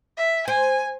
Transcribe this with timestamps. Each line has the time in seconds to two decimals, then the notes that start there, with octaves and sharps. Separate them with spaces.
0.17 E5
0.48 C5 G#5